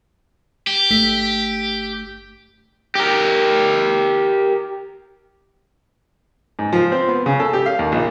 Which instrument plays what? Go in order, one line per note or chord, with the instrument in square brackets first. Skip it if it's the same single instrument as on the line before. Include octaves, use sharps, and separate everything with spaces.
[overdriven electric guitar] G4
[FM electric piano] G1 A3 B6
[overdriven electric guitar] G4 A#4
[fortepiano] G#2
F3
C4
B3
C#3
A4
G4
F5
D#2
A#1